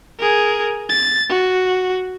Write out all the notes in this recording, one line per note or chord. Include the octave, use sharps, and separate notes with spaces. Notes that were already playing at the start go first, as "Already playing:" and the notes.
G#4 A#4
A6
F#4